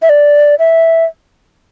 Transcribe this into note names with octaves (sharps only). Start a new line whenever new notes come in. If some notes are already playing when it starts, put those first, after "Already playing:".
E5
D5
E5